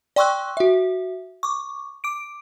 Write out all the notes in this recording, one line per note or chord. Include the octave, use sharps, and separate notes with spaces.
D5 G5 C6 C#6 E6 F#6
F#4 E5
C#6 D6
D6 D7